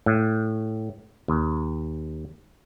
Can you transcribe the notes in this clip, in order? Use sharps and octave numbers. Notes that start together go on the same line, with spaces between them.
A2
D#2